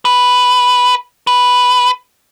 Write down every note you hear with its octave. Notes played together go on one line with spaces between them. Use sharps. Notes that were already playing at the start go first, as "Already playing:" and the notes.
B4
B4